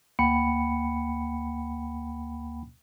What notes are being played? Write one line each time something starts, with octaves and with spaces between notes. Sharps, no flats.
D2 A#3 F#5 G5 B5 C#7